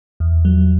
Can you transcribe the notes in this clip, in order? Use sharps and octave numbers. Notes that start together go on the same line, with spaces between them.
E2
F#3